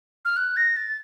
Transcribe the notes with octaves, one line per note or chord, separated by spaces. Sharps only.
F6
F#6
A#6
A6